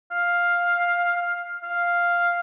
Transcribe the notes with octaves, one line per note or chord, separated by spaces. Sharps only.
F5
F5